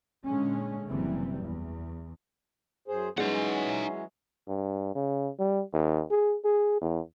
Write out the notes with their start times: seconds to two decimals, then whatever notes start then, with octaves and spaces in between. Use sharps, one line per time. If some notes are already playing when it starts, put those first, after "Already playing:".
0.25 A#2 D3 G#3 C#4
0.89 F#1 C3 E3 G3
1.43 E2
2.88 F#2 G#4 C5
3.18 E3 F#3 G#3 C#4 D#4 F#5
4.48 G2
4.95 C#3
5.39 G3
5.73 D#2
6.10 G#4
6.44 G#4
6.81 E2